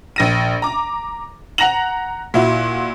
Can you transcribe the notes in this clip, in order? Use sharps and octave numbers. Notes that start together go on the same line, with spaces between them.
A#1 A#6 D#7
A#5 D6
F#5 A#5 A#6 F7 F#7
A#2 E4 F#4